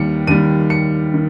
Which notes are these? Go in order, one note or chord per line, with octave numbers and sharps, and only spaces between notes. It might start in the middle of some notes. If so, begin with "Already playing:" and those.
Already playing: D#2 D#3 G3 C#7
D#2 D#3 G3 D#7
C#7
D#3